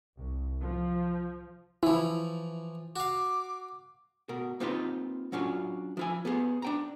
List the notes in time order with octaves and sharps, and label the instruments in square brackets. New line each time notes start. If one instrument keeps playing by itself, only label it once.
[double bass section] C2
F3
[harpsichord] E3 F3 [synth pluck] E4
[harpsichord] F#4 F5 [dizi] D6
[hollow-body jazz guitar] B2 A#4
A#3 C4 D#4 F4 G4 B4
F#3 C#4 D4 F4
F3 E4 G#5
B3 G4 G#4
D4 G5 A#5